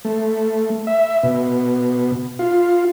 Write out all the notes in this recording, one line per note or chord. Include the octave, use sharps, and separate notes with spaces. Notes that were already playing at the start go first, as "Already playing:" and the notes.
A3
E5
B2
F4